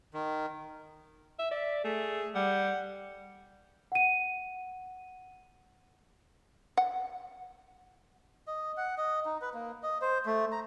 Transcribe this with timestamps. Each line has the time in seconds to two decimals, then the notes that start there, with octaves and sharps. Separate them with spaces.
0.14 D#3
1.39 E5
1.51 D5 E5
1.85 A3 G#4
2.35 G3 F#5
3.92 F#5 D#7
6.77 F#5
8.47 D#5
8.77 F#5
8.98 D#5
9.26 D#4
9.42 B4
9.54 A#3
9.83 D#5
10.02 C5
10.26 A3
10.52 A#5